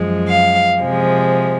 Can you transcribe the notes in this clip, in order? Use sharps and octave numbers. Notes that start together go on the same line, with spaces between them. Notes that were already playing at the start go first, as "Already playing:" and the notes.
Already playing: F#2 F3 G#3
F5
C3 F3 G#3